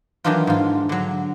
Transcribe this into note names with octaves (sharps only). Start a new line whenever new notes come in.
D#3 E3 F#3 D4 D#4 F4
G#2 F4
D3 F#3